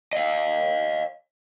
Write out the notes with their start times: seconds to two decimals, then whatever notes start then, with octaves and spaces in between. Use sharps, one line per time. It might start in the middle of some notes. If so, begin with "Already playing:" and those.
0.13 D#5 F5